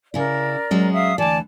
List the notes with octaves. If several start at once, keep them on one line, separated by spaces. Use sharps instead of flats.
C#3 E4 A#4 D5
F#3 G#3 C#4
E5 F5 D#6
D2 E3 D5 G#5 A5